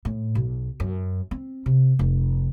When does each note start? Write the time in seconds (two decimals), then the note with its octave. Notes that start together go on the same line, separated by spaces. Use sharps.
0.05 A2
0.35 B1
0.80 F#2
1.31 C4
1.66 C3
1.99 F1